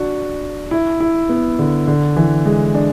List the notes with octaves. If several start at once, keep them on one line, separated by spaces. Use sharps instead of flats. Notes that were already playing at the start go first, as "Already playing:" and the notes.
Already playing: D4 F#4
E4
E4
B3
D3
D3
E3
G#3
D4